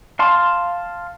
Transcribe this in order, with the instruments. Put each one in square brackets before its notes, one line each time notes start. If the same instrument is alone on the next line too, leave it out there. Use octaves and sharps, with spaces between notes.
[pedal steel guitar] F5 A5 C6